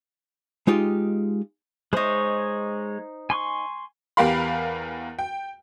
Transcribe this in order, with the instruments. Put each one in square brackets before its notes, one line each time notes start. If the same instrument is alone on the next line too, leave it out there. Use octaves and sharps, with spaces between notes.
[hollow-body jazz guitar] G#3 D#4 F4 G4
[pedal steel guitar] G#3 C#5 [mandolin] D#4 C5
[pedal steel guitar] G#5 C6 C#6
[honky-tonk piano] E2 G4 A#4 F5 B5
G5